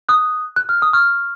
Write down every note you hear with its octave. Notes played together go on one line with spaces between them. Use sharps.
D#6 F#6
F#6
F6
D#6
C#6 F6